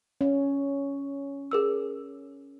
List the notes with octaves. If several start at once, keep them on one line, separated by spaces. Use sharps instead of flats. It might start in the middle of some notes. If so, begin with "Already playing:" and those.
C#4
G#4 A#4 E6